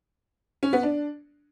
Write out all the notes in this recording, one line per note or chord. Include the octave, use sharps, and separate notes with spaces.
C#4
B3
D4